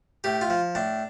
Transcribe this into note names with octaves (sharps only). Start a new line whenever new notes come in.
A2 G4
F4
F3
A2 D4